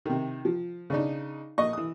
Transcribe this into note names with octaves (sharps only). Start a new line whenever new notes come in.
C3 D#3
F3
C#3 D4 D#4
A#1 D#5 C#6
E3 D#6